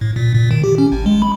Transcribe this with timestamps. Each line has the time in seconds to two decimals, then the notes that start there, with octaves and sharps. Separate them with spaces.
0.01 A2
0.16 A#2
0.34 A#2
0.51 D#3
0.64 G4
0.78 C#4
0.92 G#1
1.06 G#3
1.22 B5